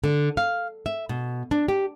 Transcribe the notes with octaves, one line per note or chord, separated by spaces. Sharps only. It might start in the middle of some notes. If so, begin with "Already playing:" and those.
D3
F5
E5
B2
D4
G4